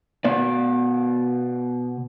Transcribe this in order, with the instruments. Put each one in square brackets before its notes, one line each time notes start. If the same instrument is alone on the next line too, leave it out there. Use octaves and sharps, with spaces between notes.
[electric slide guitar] B2 B3 D5